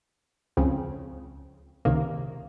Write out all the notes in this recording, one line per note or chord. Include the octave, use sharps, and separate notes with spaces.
C#2 C#3 F3 C4
C#2 C3 D#3 A#3